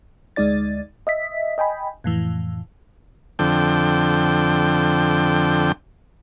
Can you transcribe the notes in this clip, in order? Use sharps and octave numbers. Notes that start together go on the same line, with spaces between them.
D2 G#3 D#4 D5 A6
D#5 E5 B6
D#5 G5 G#5 B5
F2 A2 E3
F2 D3 G5